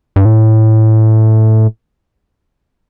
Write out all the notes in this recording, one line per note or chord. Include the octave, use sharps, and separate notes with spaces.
G2
A2